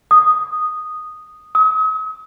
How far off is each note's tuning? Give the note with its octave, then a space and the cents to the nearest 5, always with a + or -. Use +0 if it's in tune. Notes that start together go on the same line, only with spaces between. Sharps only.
D#6 -5
D#6 +45